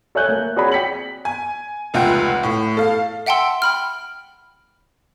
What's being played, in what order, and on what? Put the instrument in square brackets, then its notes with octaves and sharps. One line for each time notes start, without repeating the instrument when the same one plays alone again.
[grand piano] A4 C#5 E5 G#5 F#6 G6
A#3
C4 F#4 G#4 C#5 D5 B5
G5 B6 C#7 F#7
[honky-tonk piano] G#5
F1 C#2 F4 E5 F#5 G5
A2
A4 F5
[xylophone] E5 F#5 G5 A5 C6 E6
G5 B5 F6